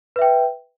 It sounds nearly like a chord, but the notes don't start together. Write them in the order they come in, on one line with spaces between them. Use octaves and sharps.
B4 E5 G5